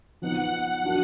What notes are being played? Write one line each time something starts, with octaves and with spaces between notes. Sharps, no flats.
F3 B3 D#4 F#5
F#3 D4 F#4 A#4